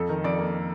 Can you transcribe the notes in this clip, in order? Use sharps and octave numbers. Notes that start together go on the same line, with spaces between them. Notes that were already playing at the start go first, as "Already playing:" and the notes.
Already playing: F2 A4
D#3 A#4
F2 D5
A#3